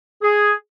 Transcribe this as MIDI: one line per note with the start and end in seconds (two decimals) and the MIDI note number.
0.22 0.53 68